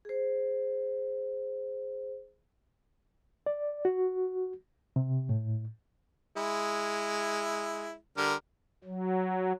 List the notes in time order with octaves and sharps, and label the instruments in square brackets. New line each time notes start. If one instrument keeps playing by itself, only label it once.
[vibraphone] G#4 C5
[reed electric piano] D5
F#4
C3
A2
[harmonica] G#3 E4
D3 G3 A#4
[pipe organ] F#3